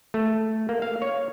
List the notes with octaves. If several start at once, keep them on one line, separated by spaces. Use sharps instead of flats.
A3
A#3
F5
C#5